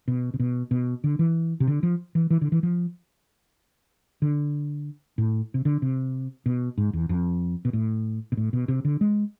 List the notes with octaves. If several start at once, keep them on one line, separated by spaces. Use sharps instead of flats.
B2
C3
B2
B2
D3
E3
C3
D3
F3
E3
E3
D3
E3
F3
D3
A2
C3
D3
C3
B2
G#2
E2
F2
B2
A2
B2
A2
B2
C3
D3
G#3